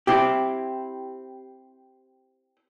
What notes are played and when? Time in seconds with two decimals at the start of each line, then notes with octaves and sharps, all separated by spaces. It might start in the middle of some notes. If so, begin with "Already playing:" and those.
0.07 C4 E4 G4